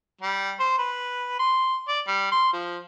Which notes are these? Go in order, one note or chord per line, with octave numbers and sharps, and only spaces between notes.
G3
C5
B4
C6
D5
G3
C6
F3